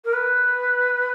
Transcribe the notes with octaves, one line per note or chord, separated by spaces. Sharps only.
A#4
B4